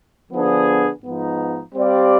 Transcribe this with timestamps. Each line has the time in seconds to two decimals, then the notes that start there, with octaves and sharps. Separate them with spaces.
0.32 D3 F3 B3 D4 G#4
1.03 G#2 F3 B3 D#4
1.74 G3 C4 G4 D5 F5